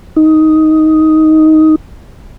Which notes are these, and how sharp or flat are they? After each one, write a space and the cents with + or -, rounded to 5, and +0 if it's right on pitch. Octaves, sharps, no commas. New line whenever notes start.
D#4 +10